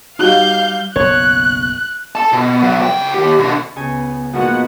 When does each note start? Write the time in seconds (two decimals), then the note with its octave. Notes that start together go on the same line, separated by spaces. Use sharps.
0.19 G3 D#4 F#4 G4 F5 G6
0.96 F#1 B1 C#5 F#6
2.15 A4 A5
2.33 B2
2.62 B2 F#3
2.82 C#2 G5
3.14 D#3 G4
3.38 B2 D3
3.76 C#2 C#3 B3 G#5
4.33 G#2 B2 F3 A#3 B3 F#4 F#5